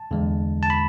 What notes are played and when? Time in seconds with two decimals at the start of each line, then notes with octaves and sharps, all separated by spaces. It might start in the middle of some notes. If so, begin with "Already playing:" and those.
Already playing: A5
0.11 E2 D3 G#3
0.63 A5
0.70 B5